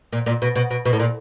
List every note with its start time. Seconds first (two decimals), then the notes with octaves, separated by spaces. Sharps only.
0.12 A#2
0.26 A#2
0.42 B2
0.56 B2
0.70 B2
0.85 B2
0.93 A2
0.99 A#2